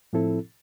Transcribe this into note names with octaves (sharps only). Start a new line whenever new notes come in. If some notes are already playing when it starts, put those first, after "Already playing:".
A2 F3 C4 E4 A4